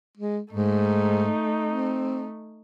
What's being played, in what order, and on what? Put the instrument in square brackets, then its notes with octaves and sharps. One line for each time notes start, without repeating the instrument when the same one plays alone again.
[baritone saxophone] G#3
[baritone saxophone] G#2 [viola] A3 D#4
[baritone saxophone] C4